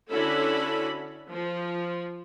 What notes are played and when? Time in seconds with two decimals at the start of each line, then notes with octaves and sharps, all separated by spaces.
0.12 D3 C#4 E4 F#4 A4 B5
1.30 F3